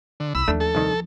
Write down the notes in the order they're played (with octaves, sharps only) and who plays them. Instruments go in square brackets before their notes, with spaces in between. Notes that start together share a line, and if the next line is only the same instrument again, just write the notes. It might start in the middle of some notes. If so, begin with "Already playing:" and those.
[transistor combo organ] D3
[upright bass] C2 [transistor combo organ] B5 E6
[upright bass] D#2 F3 [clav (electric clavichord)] A3 D4
[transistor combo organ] A4
[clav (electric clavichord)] C2 D#3